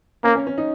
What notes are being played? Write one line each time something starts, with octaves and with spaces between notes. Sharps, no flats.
A#3 C#4
C#4
C#4
D#4